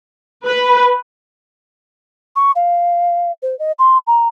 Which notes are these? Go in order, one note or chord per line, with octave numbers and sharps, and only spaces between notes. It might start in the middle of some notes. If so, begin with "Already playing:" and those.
B4
C#6
F5
C5
D#5
C6
A#5